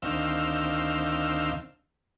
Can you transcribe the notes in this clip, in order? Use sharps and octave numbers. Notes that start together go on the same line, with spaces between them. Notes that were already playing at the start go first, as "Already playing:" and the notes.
D2 D#3 C4 F5 E6